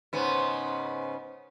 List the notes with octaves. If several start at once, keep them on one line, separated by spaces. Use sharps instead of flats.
G#2 C#3 B3